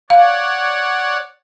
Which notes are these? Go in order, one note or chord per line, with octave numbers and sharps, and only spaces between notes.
C#5 D5 F5 F#5